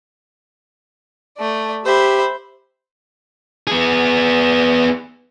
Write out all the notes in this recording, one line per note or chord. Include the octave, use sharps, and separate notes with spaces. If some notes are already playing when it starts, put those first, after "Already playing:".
A3 D5
G4 C5 E5 B5
B3 G#4